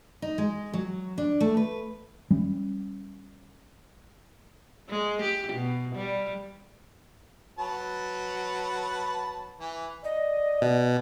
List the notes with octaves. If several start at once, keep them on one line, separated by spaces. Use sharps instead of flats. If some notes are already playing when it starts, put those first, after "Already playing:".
D#4
G#3
F#3
D4
A3
B4
G3 C#4
G#3
G4
B2
G3
F#3 B4 A5
E3
D5 D#5
B2